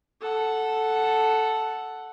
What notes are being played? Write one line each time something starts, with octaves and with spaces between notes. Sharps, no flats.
A4 F#5